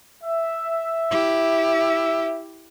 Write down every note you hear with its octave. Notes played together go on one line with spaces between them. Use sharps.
E5
E4 G4